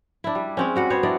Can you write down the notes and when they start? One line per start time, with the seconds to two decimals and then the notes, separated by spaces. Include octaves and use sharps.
0.24 D4 E4
0.35 G3
0.57 G#3 C4 C#4
0.76 G3 F#4 F#5
0.90 B3 C5 C#5
1.03 D4 E4 D5 D#5